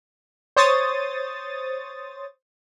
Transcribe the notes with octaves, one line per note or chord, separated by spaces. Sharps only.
C5 C#5 D#6 A6